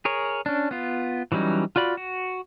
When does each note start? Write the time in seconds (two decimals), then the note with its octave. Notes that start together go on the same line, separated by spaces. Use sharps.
0.05 G#4 A#4 C#5
0.46 C#4 D4
0.71 B3 F4
1.32 E3 F#3 G3 C#4 D#4
1.76 F4 F#4 D5 B5
1.97 F#4